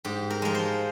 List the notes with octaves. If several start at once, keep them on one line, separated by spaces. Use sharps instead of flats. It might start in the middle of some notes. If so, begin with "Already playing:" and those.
G#2 G4
A#4
F3 G#3 A#4
C5